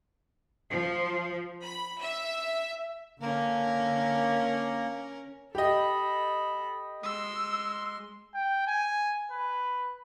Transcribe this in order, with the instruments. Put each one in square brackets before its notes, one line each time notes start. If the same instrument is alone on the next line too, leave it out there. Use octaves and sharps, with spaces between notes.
[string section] F3
B5
E5
[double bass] D3 [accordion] A#3 [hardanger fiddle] C#4 A#4
[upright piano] G4 D#5 [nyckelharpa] A4 B5
[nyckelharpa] G#3 C6 [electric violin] E6
[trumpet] G5
G#5
B4